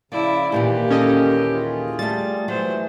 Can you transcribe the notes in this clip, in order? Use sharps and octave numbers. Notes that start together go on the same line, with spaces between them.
C#3 F3 E4 D5
D#2 A#2 E3 A#3 G4
C#4 A4 D#5
F4 G#4
G3 A3 A6
E3 F#3 C5